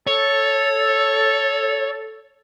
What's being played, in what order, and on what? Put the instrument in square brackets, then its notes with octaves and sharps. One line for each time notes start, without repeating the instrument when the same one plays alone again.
[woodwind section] A4 [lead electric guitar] C#5